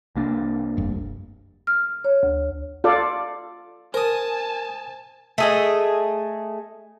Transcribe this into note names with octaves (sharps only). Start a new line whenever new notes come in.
C2 A#3 D4
F1 G2
F6
C#5
D2
F4 A4 D5
A#4 C5 G#5 A5 D#6
A3 G#4 D#5